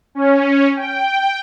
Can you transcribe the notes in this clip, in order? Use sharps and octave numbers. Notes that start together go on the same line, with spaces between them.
C#4
G5